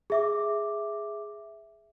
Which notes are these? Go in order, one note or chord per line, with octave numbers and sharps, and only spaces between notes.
G#4 E5 D6